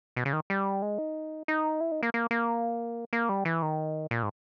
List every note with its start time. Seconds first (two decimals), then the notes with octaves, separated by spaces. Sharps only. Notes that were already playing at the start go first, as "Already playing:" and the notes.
0.16 B2
0.25 C#3
0.33 D#3
0.50 G3
0.82 G#3
0.98 D#4
1.48 D#4
1.81 E4
1.92 D#4
2.03 A#3
2.14 A#3
2.31 A#3
3.13 A#3
3.29 G3
3.45 E3
3.62 D#3
4.11 A#2
4.23 G#2